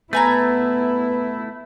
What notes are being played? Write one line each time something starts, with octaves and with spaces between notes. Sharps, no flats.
A3 B3 E4 B4 G#5 A#5